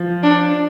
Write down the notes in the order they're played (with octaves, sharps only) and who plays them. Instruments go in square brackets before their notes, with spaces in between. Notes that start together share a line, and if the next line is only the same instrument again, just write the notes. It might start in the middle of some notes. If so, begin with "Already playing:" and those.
Already playing: [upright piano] F3
[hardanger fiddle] D4